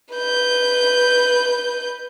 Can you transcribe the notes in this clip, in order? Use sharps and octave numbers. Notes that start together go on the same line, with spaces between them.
B4 G6